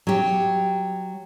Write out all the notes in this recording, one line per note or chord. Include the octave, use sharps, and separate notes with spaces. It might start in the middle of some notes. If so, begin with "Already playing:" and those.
F#3 G4